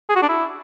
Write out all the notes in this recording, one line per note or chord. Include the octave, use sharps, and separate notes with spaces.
G#4
F#4
D4
E4